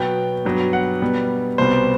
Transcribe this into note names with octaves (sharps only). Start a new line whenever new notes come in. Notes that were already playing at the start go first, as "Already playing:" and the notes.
Already playing: B2 F#3 B3 G5
G2 F#3 B3
F#5
B2 G3 B3
C2 B2 G3 B3 C5